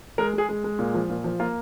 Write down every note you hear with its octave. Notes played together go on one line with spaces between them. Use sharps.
G#3 A#4
G#3 G#4
G#3
G#3
A#2
F3
A#2
F3
A#3 F4